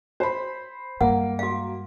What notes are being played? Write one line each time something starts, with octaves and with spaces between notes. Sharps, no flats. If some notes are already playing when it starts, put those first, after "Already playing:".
C5 B5
G2 G#3 A#3 F#5
F#4 F5